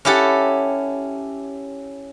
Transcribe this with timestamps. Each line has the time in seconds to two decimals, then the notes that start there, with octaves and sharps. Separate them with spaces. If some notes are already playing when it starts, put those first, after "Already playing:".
0.05 C#4 E4 G4 A4 F#5